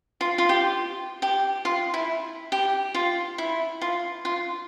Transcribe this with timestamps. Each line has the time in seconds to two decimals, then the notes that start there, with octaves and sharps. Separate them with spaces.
0.21 F4
0.38 F4
0.49 G4
1.22 G4
1.65 F4
1.94 E4
2.52 G4
2.94 F4
3.38 E4
3.81 F4
4.25 F4